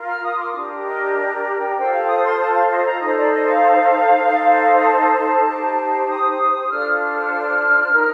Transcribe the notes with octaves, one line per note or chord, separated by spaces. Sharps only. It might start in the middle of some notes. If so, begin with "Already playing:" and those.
Already playing: F4 A#4
F6
D#6
C6
D6
D4 G4 A#4
D#5
D5
G5
F4 A4 C5 G5
F5
D#6
C6
A5
F5
D#5
A#5
D#4 A4 C5 D#5
D5
D#5
F5
D#4 A4 C5
A5
D#4 G4 C5
D#6
D4 F4 A4 C5 F6
F6
F6
D#4 A#4